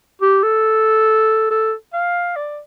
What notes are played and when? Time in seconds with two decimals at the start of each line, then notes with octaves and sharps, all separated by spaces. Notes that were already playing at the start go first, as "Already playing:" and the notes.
0.22 G4
0.43 A4
1.51 A4
1.93 F5
2.36 D5